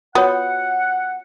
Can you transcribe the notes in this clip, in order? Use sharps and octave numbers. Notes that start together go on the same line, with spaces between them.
B3 F4 F#4 C#5 F#5